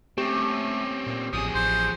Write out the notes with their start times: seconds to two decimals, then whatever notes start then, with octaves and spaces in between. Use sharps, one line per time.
0.18 A3 C4 C#4 G4 C#6
1.06 A#2
1.33 A1 F3 G#4 D#6
1.55 A1 C5